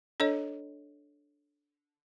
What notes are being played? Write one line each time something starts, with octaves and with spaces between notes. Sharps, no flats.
D4 A4 C#5 D#5